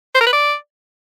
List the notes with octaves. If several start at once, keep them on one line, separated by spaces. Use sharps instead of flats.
C5
A#4
B4
D5